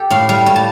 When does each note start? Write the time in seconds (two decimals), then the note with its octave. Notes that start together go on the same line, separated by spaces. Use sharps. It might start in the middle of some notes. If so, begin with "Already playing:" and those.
Already playing: G4 A4
0.10 A2 F5
0.29 G3 F5
0.46 A2
0.56 A5